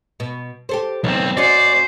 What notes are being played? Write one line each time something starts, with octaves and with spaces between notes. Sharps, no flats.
B2
G4 A4 C5
B1 B3 C4
C#4 F#4 C5 D5 D#5